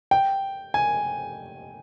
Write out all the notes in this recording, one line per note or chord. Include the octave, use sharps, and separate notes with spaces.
G5
G#5